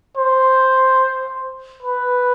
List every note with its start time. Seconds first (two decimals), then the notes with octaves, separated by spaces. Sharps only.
0.17 C5
1.82 B4